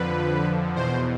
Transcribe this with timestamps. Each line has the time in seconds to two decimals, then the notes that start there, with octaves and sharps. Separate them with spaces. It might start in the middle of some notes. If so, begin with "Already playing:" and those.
Already playing: F2 D3 F3 B4
0.75 E2 B2 C5